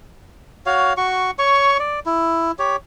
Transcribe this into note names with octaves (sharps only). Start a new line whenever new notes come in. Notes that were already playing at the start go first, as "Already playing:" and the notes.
F#4 C#5 F5
F#4 C#6
C#5 C#6
D5
E4
G4 C#5